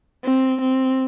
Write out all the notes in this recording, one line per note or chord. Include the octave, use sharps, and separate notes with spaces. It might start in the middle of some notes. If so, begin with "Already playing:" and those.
C4
C4